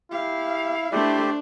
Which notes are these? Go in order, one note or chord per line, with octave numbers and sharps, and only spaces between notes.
E4 G4 F5
A3 D4 E4 G4 C5 D5